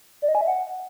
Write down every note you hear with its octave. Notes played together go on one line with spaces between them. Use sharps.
D5
D#5
G#5
E5
F#5